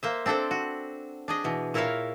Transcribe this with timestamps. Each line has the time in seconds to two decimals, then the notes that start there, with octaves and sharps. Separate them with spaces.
0.03 A#3 C5 E5
0.26 C4 D4 A4 C5 G5
0.51 F#4
1.28 D4 G#4 D#5
1.44 B2 E3
1.74 A#2 E4 A#4 C#5 E5 F5